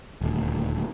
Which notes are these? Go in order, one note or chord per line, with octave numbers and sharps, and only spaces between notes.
D#1 D2